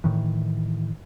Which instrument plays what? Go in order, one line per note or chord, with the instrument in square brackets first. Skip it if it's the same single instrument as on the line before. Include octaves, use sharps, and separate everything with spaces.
[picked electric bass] A2 D#3 E3